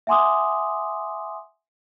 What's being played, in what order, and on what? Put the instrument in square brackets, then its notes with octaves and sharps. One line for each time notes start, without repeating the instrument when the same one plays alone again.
[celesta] E5 F#5 G#5 C6 D6 D#6